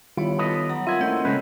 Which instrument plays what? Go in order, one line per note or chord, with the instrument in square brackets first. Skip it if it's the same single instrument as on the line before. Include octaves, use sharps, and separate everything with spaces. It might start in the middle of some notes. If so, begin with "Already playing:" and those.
[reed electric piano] D#3 G3 F4 [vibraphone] B3 C#5 [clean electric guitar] E4
[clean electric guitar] A4 B4 D#5
[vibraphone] F#3 F#5 A#5
[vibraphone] C4 A#4 F#5 [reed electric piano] F4 G#6 [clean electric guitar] E5
[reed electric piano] A3 [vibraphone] A#3 E4 D#5 [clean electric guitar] C4 C#4
[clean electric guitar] C#3 G#3 B4 [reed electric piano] A3 C#4